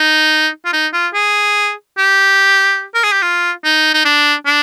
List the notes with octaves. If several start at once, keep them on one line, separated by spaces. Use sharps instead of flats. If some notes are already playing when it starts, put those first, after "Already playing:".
Already playing: D#4
F4
D#4
F4
G#4
G4
A#4
G#4
G4
F4
D#4
D#4
D4
D4